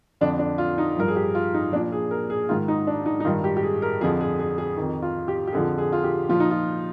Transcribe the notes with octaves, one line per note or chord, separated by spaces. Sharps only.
F2 D3 F3 D4
D4
F4
D#4
G2 F3 A#4
G#4
G4
F4
D#4
A#2 F3 D4
G#4
A#4
G#4
G#2 D#3 F4
D#4
D4
D#4
D#4
G2 D#3 F4
G4
G4
G#4
A#4
F2 D3 F3 G#4
G#4
G#4
G#4
F2 D#3
F4
G4
G4
F2 D3 F3 G#4
G#4
F4
G4
A#2 F3 F4
D#4
F4